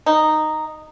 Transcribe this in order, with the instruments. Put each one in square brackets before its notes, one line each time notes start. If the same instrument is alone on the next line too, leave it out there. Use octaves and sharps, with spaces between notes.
[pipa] D#4